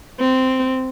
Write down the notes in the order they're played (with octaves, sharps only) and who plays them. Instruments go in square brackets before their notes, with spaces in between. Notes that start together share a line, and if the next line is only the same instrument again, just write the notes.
[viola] C4